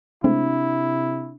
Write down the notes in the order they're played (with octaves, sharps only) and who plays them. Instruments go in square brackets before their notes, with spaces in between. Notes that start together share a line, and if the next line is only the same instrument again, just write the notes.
[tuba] C3 [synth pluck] G#3 A3 C4 [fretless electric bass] D4 [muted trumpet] E4